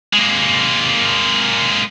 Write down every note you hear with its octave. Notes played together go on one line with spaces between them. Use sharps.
G#3 A#3